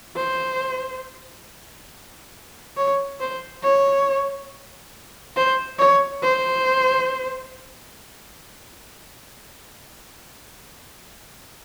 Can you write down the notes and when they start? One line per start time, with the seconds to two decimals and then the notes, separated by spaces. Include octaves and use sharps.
0.16 C5
2.77 C#5
3.20 C5
3.63 C#5
5.36 C5
5.79 C#5
6.23 C5